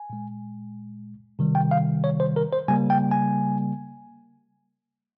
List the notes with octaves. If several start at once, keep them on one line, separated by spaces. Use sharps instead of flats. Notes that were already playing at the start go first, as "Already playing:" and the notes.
Already playing: G#5
A#2 G#3
C3 D#3 G3
G5
F5
C#5
C5
A#4
C5
C#3 G3 A#3 G#5
G5
G#5